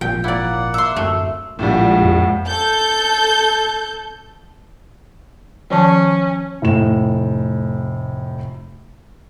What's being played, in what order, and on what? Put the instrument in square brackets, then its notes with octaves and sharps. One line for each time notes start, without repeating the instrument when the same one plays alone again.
[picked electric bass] G#1 A#2 F3 [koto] G5
[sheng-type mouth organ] A#3 F#5 [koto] E4 D5
[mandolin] E5 C6
[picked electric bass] D1 F#2 [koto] A3
[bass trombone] A#1 [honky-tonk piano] A2 G3 [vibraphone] G#3 F5 F#5
[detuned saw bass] F2
[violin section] A4 G6
[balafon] D#3 F3 A5 [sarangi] C#4
[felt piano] F1 A2 E7